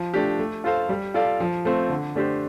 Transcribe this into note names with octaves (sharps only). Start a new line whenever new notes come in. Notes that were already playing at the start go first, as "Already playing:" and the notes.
Already playing: F3
A3 D4 G4
A3
F4 A4 C5 F5
G3
F4 A4 D5 F5
F3
A3 C4 F4 C5
D3
A3 D4 G4 C5